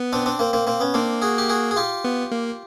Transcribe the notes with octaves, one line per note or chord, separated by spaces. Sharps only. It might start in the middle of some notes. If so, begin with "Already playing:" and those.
Already playing: B3
C4 D4
C4 D4
A#3 C4
A#3 C4
A#3 C4
B3 C#4
A#3 C4 D4
F#4 G#4
G4
F#4 G#4
G#4
F4 G4
B3
A#3